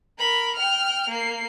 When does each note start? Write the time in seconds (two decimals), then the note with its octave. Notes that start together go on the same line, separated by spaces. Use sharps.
0.19 A#4 B5
0.56 G5 F6
1.09 A#3 C7